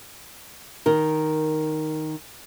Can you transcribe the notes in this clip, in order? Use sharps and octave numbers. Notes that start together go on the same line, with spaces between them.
D#3 A#4